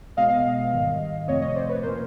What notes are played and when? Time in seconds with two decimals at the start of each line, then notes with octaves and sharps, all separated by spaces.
0.17 B2 G#3 B3 D#5 F5
0.72 G#2 D#3 G3
1.28 F2 C3 F3 A3 C4 C#5 D#5
1.42 C#5 D#5
1.55 C5 D5
1.69 B4 C#5
1.83 A#2 F3 A#3 C#4 A#4 C5